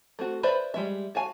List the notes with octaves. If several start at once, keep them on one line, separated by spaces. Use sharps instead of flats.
A3 C4 F#4
B4 C5 D5 E5 B5
G3 G#3 E5
F#4 F5 G#5 A5